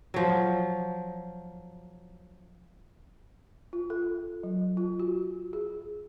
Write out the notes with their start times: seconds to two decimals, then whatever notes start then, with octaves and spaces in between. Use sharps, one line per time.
0.14 F3 F#3
3.73 F4
3.90 A4
4.43 F#3
4.77 F4
5.00 F#4
5.53 G#4